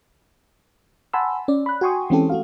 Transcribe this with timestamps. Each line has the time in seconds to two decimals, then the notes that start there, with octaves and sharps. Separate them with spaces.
1.13 F#5 G#5 A5 B5 C6 E6
1.48 C#4 D5
1.66 B5 F#6
1.81 F#4 G5 G#5 C6 C#6 D#6
2.10 E3 G#3 C4 C#4 G4 A4
2.30 A3 F#4 F5